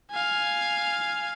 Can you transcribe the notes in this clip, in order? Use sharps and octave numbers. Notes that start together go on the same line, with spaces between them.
F5 G#5